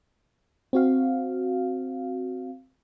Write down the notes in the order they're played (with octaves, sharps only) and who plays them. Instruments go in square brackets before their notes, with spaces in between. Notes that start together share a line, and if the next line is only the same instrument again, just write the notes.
[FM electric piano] C4 F#4 F5